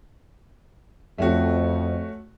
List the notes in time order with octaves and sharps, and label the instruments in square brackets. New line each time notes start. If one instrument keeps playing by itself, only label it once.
[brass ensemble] F2 [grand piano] A3 C#4 F#4